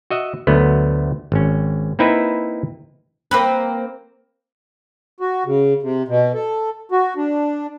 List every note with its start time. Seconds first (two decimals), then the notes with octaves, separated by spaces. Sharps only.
0.10 F#4 D#5 E5 F#5
0.47 D2 F#3 A3 B3
1.32 G#1 C#4
1.99 A#3 C4 D#4 E4 B4 E5
3.31 A#3 C4 B4
5.20 F#4
5.46 C#3
5.82 C3
6.08 B2
6.34 A4
6.92 F#4
7.17 D4